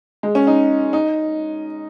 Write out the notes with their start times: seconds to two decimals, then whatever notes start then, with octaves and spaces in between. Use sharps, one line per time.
0.23 G#3
0.35 C#4
0.47 D#4
0.93 D#4